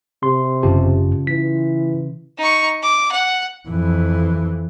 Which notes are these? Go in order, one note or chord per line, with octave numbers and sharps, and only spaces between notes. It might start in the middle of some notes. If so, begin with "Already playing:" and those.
C3 C6
G1 F#2 C#3 F4 G4 A5
E3 B6
D#4 C#6
D6
F#5
F2 E3